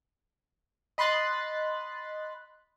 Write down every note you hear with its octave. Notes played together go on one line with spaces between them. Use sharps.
D#5 B5 C6 F#6 A6